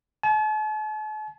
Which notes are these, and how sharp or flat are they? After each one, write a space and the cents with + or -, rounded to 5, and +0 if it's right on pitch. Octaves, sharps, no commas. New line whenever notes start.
A5 -45